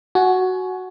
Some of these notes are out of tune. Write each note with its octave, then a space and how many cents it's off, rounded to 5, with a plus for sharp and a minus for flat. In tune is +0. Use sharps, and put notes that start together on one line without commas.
F#4 +0 G#5 +25